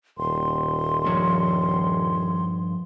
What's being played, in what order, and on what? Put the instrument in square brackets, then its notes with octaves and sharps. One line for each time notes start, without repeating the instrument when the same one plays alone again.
[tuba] D#1 [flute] C6
[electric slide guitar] G2 F3 C#5